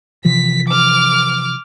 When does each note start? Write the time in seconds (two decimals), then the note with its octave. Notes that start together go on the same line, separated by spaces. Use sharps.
0.25 C3 E3 F3 B6
0.68 D6 F6